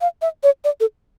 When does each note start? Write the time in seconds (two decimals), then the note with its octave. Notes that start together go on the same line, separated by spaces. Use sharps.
0.01 F5
0.22 E5
0.43 C#5
0.64 D5
0.80 A4